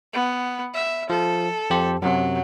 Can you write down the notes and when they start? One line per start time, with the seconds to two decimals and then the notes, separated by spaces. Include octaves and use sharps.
0.13 B3
0.74 E5
1.10 F3 A4
1.70 F2 G4 C5
2.02 F#2 C3 F#3